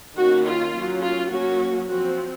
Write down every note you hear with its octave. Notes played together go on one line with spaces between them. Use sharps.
D#3 A#3 C#4 F#4
F4
F#3 A#3 C#4
F4
F#3 A#3 C#4 F#4
F3 C4 F#4